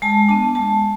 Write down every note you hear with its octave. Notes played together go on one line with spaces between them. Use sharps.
G#3 A5
B3 D4 A5
G#3 A5